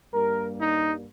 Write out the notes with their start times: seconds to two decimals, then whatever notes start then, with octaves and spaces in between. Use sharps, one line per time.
0.13 G2 G3 A#3 A#4
0.60 D#4